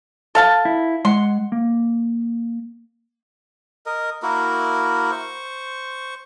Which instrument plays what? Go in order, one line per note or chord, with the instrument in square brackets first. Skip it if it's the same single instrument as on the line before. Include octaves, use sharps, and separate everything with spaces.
[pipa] A4 F5 A5
[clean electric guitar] E4
[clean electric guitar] G#3 F#5 [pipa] C6
[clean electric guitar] A#3
[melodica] A#4 D#5
A#3 E4 F#4 A#4
C5 C#6